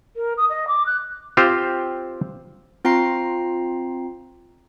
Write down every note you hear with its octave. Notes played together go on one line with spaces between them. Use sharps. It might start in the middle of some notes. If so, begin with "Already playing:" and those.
A#4
D#6
D#5
D6
F#6
C4 F4 G4 C5
C4 F4 G5 A#5 C7